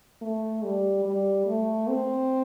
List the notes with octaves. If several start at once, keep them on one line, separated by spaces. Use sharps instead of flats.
A3
G3
G3
A3
C4